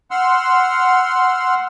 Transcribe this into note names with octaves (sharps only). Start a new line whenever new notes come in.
F#5 C6 E6 F6